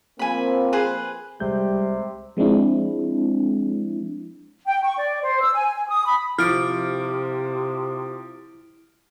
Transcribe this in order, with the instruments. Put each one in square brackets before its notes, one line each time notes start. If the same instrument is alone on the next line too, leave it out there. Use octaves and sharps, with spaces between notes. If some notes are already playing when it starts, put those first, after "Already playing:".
[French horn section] F3 A#3 C4 [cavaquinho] G#5 B5
[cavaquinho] G#4 B4 C5
[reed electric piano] C2 G#3 G6 [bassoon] C3 [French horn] G3
[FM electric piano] F3 G#3 C4 D4 E4
[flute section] G5
C#6
D5
C5
E6
G#5
G#5
D#6
B5
[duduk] C3 [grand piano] F3 [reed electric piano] E4 D6 [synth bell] F6 D7